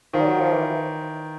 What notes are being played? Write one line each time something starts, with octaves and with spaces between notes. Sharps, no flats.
D#3 F3
G3
F#3
F3
E3